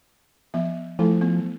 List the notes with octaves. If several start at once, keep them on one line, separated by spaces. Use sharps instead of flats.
F3 B3 E5
F3 A3 E4 A4
B3